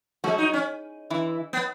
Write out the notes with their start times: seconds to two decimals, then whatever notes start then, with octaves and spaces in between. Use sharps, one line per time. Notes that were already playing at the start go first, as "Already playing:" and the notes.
0.24 F#3 G#3 F#4
0.38 D#4
0.53 C#4
1.10 E3 E4
1.53 B3